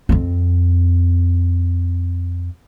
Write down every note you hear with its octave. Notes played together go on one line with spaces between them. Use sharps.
F2 C4